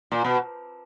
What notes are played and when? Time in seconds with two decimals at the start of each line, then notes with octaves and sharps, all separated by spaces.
0.12 A#2
0.25 B2